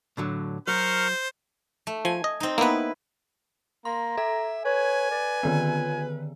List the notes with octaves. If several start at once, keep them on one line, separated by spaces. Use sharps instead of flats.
A2 D3 F#3
F#3 A#4 C5 C#6 F6
A3
F3 G#5
D#5
C4 D#4
A#3 B3 E4 B4
A#3 A#5 C6
A4 E5
B4 C#5 G#5
B4 D5
D3 D#3 B3 F4